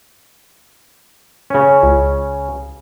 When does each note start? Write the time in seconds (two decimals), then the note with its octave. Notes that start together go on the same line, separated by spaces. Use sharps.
1.50 C#3 C#4
1.83 C#2